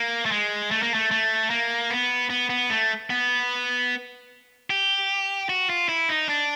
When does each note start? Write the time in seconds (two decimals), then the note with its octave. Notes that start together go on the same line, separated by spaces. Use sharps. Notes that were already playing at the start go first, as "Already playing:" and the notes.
Already playing: A#3
0.26 A3
0.31 G#3
0.71 A3
0.83 A#3
0.94 A3
1.11 A3
1.50 A#3
1.90 B3
2.30 B3
2.50 B3
2.70 A3
3.10 B3
4.70 G4
5.49 F#4
5.70 F4
5.89 E4
6.09 D#4
6.29 D4